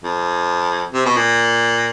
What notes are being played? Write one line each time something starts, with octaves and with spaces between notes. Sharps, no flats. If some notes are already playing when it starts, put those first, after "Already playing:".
F2
C3
B2
A#2